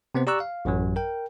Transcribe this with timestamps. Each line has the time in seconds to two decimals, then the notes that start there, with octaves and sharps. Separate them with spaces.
0.15 C3 B3 C4 C5
0.27 G4 D5 A#5 C#6 E6 F#6
0.40 F5
0.65 A1 F#2 F#3
0.96 A#4 G5